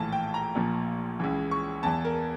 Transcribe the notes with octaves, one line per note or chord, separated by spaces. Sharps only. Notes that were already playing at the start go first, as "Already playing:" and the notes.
Already playing: A#1 A2 E3 A5
G5
A#5
A#1 A#2 F3
C#2 C#3 E3
C#6
E2 E3 A5
A#4